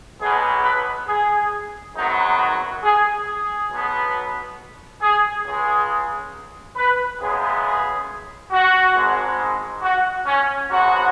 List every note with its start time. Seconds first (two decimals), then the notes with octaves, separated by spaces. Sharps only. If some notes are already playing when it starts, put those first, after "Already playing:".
0.20 B1 B2 B3 G#4
0.64 B4
1.07 G#4
1.95 G#1 F#2 D#3 F#3 B3 D#4
2.38 F#4
2.82 G#4
3.26 G#4
3.70 B1 B2 B3
5.01 G#4
5.44 C#2 C#3 G#3 G#4
6.75 B4
7.19 F#2 C#3 G#3 B3 G#4
7.63 G#4
8.51 F#4
8.94 G#1 G#2 G#3
9.82 F#4
10.25 C#4
10.69 G#1 G#2 F#3 B3 F#4